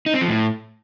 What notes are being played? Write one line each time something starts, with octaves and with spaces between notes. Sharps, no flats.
D#4
C4
F3
A2